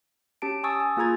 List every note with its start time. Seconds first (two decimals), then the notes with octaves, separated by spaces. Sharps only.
0.42 C#4 G4 A5 D7
0.64 G#5 A5 C#6 D#6 E6 A6
0.80 G#5
0.97 A#3 F4 G#4 A#5 G#6 A6